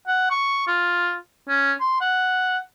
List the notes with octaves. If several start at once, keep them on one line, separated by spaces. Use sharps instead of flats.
F#5
C#6
F4
C#4
C6
F#5